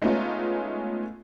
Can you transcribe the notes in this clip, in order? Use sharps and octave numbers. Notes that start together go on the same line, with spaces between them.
G#3 A3 B3 C#4 D#4 F4